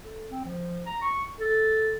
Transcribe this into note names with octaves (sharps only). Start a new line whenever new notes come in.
A4
C4
F3
A#5
C#6
A4